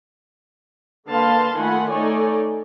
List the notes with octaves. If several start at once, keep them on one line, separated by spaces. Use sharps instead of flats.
D3 A#3 B4 F5 A5 C6
D#3 A3 F4 F#5 G#5 B5
A3 D#4 C#5 D5 G#5